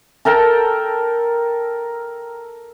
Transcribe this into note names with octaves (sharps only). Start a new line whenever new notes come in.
A4 A#4 G5 A5